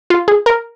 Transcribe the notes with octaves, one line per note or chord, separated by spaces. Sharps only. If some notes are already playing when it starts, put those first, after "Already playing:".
F4
G#4
A#4